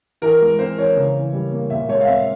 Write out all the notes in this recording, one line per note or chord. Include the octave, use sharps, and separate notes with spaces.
E3 A#4
G#3
C4 C5
E3 C#5
C#3
E3
G3
A#3
A#2 E5
G#3 C#5
F5
C4 E5